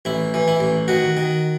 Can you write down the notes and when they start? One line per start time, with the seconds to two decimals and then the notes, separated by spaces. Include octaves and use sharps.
0.05 A1 E4
0.34 E3
0.48 E4
0.60 A1
0.88 D#3 F#4
1.17 D#3